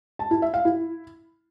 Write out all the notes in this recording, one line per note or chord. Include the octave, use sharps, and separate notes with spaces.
A5
E4
E5
F5
E4